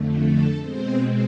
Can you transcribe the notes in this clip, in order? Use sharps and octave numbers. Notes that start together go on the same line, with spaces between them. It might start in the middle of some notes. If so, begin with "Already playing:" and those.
Already playing: F2 D3 A3
A4
B2 G#3 C4 C5